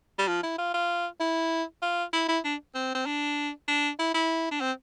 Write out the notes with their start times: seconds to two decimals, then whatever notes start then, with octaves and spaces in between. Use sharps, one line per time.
0.19 G3
0.28 F3
0.43 E4
0.58 F4
0.74 F4
1.20 E4
1.82 F4
2.13 E4
2.29 E4
2.44 D4
2.75 C4
2.95 C4
3.06 D4
3.68 D4
3.99 E4
4.14 E4
4.51 D4
4.61 C4